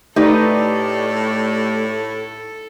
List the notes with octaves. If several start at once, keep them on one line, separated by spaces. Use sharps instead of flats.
A2 A3 D#4 G4 A4 B4 D5